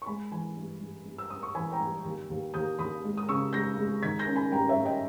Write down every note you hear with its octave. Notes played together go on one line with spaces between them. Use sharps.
C#6
G#3 G#5 B5
E3 G#5 B5
G2
G2
G2
E6
G2 D#6
C#6
E3 G#5 B5
G5 A#5
G2
D#2
D#2
D#2 D#6 G6
D#2 B5 D#6
G#3
D#6
C#3 C#6 E6
G#3 G6 A#6
G#3
D#3 G#6 B6
G6 A#6
C#4
G#5 B5
G2 G5 A#5
C#5 E5
G2
D#5 G5